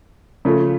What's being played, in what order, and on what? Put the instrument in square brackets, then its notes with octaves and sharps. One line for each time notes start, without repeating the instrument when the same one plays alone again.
[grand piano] C#3 F3 A3 C#4